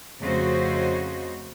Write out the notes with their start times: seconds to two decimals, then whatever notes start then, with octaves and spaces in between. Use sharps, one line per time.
0.20 F2 C#3 A3 F#4 C5 D#5